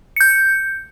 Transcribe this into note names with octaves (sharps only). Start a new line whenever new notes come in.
G6 C#7